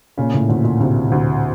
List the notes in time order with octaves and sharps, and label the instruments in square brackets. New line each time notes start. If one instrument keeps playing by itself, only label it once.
[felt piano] A#2 [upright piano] C#3
[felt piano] A2
[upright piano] D2 [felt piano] A#2
[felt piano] A#2
[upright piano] D2 [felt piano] C3
[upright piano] D2